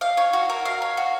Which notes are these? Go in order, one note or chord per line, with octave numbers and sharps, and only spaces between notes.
F5
C#5
F#4
A#4
F5
C#5
F#4